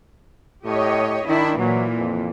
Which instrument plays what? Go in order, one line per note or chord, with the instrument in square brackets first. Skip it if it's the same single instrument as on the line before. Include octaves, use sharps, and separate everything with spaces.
[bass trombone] A2 [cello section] G4 C#5 D#5
[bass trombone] D#3 [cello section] D4 E4
[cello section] A#2 E3 [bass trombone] F#3
[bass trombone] F2